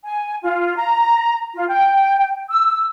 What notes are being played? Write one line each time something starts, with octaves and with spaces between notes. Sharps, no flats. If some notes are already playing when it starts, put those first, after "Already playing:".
G#5
F4
A#5
F4
G5
E6